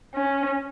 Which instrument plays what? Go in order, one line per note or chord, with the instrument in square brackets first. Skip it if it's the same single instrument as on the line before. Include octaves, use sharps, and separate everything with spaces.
[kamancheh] C#4